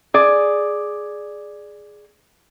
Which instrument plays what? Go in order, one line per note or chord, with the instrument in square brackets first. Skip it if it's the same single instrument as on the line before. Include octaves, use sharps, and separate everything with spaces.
[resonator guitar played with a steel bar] G#4 D5